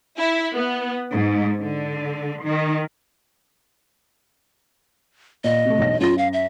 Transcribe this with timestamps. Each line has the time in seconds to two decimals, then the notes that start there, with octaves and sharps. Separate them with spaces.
0.17 E4
0.55 B3
1.11 G#2
1.61 D3
2.43 D#3
5.44 A#2 D#5
5.65 C3 A3
5.78 E1 B1 A#6
6.00 F#2 F4 A#6
6.18 F5
6.33 E5